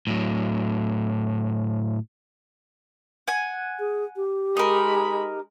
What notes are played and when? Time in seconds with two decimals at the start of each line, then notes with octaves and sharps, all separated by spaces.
0.07 A2 F#3
3.28 F#5 G#5
3.79 G#4
4.16 G4
4.57 G#3 D#4 A#4 B5